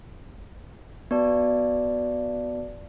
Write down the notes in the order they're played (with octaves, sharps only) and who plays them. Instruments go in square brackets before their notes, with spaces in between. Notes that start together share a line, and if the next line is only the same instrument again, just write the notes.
[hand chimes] B3 F#4 D5 A5